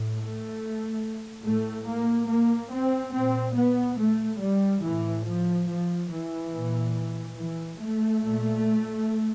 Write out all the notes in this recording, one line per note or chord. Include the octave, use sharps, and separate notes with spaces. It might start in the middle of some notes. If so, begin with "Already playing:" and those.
Already playing: A2
A3
A2 A3
A#3
A#3
C4
A#2 C4
B3
A3
G3
A2 E3
F3
F3
E3
A#2
E3
A3
A#2